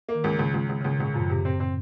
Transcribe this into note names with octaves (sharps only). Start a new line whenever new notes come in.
A#3
D#3
C#2 C#3
C#2
C#2
C#2
C#3
C#2
A#2
C#2 A2
F#2 F3
C3
C4
C4